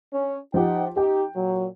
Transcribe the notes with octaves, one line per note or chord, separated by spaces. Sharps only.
C#4
F3 D#4 G4 F#5 G5
D#4 G4 G5
A#2 F#3